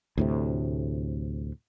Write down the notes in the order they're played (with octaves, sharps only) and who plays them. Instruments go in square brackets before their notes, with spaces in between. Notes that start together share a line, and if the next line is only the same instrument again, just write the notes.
[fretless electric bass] D2 A2 C3